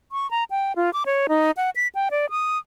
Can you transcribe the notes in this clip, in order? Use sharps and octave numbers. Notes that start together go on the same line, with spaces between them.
C#6
A#5
G5
F4
D6
C#5
D#4
F#5
B6
G5
D5
D#6